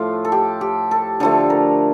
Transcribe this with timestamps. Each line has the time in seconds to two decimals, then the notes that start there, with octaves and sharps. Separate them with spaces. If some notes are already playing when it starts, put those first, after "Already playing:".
Already playing: A2 F3 A3 F4
0.25 A4
0.32 G4
0.61 G4
0.91 A4
1.20 D3 F3 A3 A4
1.50 A#4